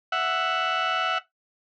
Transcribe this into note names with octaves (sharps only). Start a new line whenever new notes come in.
E5 F#5